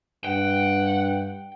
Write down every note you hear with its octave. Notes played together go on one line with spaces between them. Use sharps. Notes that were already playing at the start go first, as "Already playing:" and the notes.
G2 F#5 G5